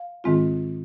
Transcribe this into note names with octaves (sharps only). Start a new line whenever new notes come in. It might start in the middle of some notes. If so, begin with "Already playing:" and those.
Already playing: F5
G#2 D#3 G#3 C4 F4